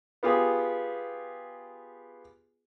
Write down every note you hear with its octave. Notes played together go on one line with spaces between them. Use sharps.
B3 F4 G4 G#4